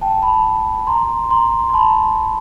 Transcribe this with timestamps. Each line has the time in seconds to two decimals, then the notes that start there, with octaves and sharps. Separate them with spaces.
0.01 G5 A5
0.22 A5 B5
0.87 A#5 C6
1.30 A#5 C6
1.69 C6
1.74 A5 B5